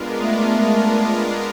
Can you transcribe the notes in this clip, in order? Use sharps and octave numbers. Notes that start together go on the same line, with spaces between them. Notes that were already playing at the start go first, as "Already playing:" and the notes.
Already playing: G#3 B3 D4 F4 A#4
A3